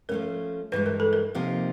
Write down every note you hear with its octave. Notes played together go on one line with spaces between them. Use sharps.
F3 A3 C#4 A#4
G2 E3 G#3 B4
A#4
A4
A#4
C3 F3 A#3 D#4